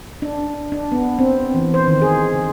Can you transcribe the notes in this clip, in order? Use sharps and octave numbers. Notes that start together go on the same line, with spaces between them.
D4
D4
B3
C4
E3
C5
D#3
G#4
D3